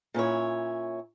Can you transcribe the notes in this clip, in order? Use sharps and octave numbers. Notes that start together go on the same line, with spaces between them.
A#2 C#4 E4 C#5